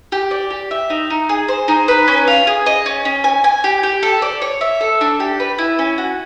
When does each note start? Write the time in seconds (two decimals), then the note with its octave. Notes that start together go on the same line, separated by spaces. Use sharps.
0.12 G4
0.31 D5
0.51 G4
0.71 E5
0.90 D#4
1.10 D#4
1.29 G#4
1.48 C5
1.68 D#4
1.88 B4
2.08 C#4
2.27 F4
2.47 G#4
2.66 D#5
2.86 C#4
3.05 C#4
3.24 G#5
3.44 G#5
3.64 G4
3.83 G4
4.03 A4
4.22 D5
4.42 C#5
4.61 E5
4.81 A4
5.01 D4
5.20 G4
5.40 B4
5.58 E4
5.79 C#4
5.98 F#4